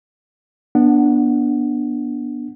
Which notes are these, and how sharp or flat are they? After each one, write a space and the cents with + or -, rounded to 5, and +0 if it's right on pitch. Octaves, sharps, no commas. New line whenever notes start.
B3 -25 D4 +0 F#5 +0